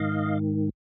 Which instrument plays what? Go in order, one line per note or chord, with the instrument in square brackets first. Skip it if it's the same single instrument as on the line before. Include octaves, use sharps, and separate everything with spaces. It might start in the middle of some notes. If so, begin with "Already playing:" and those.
Already playing: [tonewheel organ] G#2 D#3 D#5 F5